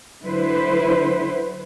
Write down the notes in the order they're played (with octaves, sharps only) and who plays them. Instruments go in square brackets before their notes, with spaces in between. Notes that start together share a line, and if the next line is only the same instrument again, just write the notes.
[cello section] D3 F#3 E4 B4 C5